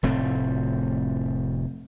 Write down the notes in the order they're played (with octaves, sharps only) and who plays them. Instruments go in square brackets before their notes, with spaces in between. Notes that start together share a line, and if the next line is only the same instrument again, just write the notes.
[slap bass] F1 A2 A3 C4